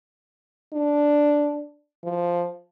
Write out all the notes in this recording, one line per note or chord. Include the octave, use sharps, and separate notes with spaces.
D4
F3